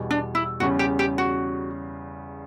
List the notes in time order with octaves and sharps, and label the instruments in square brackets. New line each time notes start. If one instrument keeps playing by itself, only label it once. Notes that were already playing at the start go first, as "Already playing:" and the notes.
Already playing: [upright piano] E2 B2 G3
[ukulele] D4
E4
[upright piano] E2 C#3 G3 C#4 [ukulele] F#4
[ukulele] G4
G4
F#4